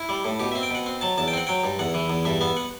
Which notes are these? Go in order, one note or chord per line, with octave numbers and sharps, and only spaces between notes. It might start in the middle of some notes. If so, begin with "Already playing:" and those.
Already playing: E4
G3
A2
B2 G4
E5
C4
G5
B2 F#5
C4
F#3 A5
E2 A5
G5
C4 F#5
F#3 G5
G2
E2 F#5
E3
E2
G2 E5
B3 E5
F#5